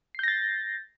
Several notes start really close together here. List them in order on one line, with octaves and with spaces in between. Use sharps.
C7 G6 A#6 A6